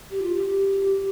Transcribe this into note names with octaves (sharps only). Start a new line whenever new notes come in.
G4
F4
G4